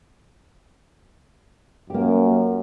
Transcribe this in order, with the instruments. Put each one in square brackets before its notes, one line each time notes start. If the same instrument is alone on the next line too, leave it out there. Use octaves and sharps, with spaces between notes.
[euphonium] F#2 [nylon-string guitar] A#3 G4